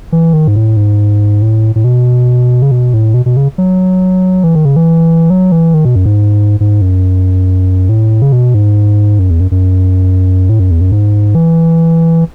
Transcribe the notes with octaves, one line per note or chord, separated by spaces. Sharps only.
E3
D#3
G#2
A2
G#2
A2
A2
B2
C#3
B2
A2
B2
B2
C#3
F#3
E3
D#3
C#3
E3
F#3
E3
D#3
B2
F#2
G#2
G#2
F#2
A2
C#3
B2
G#2
F#2
E2
F#2
F#2
A2
F#2
E2
F#2
G#2
E3